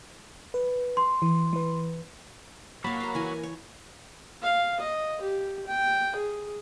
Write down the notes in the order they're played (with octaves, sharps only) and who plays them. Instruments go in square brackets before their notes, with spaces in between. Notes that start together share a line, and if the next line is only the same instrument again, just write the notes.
[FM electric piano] B4
[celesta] C6
[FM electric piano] E3
E3 B4
[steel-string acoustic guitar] A#3 [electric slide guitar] F#4 C#5 [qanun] F5 A5 [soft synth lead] B5
[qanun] F5 A#5
E3 G#5
C#5
[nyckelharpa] F5
D#5
G4
G5
G#4